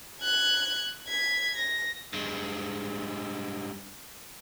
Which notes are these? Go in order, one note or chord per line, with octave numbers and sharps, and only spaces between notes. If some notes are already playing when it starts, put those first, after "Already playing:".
F#6 G#6
G#6 B6
A#6
G2 G#3